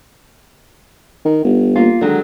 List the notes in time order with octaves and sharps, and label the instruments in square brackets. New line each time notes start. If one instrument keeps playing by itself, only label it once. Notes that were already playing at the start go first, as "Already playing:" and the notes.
[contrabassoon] D#3
G1
[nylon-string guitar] A#3 F4
[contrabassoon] D3 [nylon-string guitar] D#3 F#3 G#3